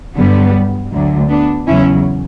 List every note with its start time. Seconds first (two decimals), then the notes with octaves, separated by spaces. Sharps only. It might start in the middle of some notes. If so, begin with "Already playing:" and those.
0.16 G2 D3 F#3 G3 B3
0.92 D2 D3 F#3
1.30 B3 D4
1.67 E2 C#3 F#3 C#4 E4